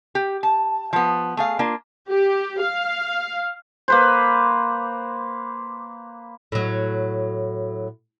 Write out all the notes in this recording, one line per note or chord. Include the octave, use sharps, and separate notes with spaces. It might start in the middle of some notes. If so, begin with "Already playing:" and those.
G4
A5
F3 B3
A3 G#4 F5
A#3 D4 F4
G4
F5
A#3 B4 C5
A2 F#3